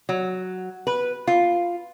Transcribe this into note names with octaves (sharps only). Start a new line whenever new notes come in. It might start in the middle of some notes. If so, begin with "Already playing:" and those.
F#3
B4
F4